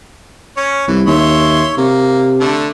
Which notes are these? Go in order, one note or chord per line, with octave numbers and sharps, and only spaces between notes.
C#4 C#5
C2 E3
D#2 C#5 E5 C6
C3 A#3
D3 A3 A5